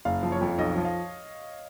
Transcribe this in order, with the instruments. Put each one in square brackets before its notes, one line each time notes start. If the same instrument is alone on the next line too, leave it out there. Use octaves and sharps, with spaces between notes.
[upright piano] F#1 [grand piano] F5
[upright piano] F3
[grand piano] C#5
[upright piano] F2
[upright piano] B1 [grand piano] D#5
[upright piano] F3
[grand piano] F5